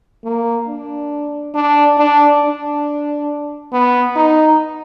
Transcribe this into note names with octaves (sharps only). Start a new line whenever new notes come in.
A#3
D4
D4
D4
D4
B3
D#4